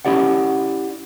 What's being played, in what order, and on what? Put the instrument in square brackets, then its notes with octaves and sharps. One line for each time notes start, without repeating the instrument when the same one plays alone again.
[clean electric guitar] C#4 E4 G4 D5 F#5